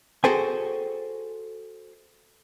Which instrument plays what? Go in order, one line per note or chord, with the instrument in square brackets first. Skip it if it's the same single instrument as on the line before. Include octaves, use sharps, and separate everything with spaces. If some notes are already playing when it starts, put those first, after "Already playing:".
[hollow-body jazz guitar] F#4 G#4 A4 C5 G5 G#5